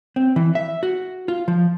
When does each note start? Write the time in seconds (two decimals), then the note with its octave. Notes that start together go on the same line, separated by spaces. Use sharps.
0.16 C4
0.36 E3
0.55 E5
0.83 F#4
1.28 F4
1.48 F3